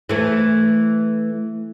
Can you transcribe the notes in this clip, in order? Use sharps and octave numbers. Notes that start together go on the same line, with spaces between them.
E3 A3